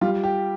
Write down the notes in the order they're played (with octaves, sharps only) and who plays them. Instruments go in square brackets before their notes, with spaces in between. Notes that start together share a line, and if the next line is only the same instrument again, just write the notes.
[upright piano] G3 [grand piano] F4
[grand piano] G4